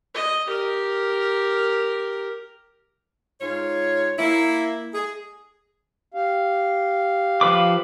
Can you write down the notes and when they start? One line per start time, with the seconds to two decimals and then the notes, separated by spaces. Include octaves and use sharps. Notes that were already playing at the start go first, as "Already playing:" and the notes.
0.14 D#5
0.47 G4 A#4
3.41 G#2 F4 C#5
4.19 A#3 E4
4.94 G#4
6.14 G4 F5
7.41 F3 B4 D6